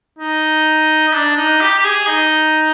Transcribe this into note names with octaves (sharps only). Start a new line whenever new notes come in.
D#4
D#4
D4
D#4
G4
G4
G#4
D#4